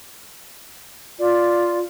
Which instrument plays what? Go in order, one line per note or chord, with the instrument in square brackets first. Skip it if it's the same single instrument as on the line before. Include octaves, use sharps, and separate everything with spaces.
[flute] F4 [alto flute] D5